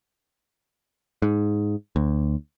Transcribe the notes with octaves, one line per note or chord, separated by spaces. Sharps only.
G#2
D2